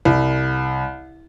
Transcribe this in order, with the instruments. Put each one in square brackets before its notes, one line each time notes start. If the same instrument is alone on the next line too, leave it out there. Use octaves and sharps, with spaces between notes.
[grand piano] C2